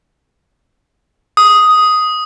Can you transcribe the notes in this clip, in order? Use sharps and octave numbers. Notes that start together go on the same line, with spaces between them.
D#6